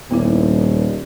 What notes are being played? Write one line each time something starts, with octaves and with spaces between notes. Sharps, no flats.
D#1 B3 E4